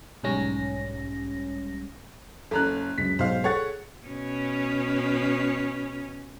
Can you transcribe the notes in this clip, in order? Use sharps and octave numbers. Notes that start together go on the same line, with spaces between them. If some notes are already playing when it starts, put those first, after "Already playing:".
B1 G#2 G3 C#4 A#6
F#1 C#4 A4 A#5 F#6
C#2 F#2 B6
B1 G#2 C5 F5
G#4 A4 C#5 F#5 A6
B2 C#4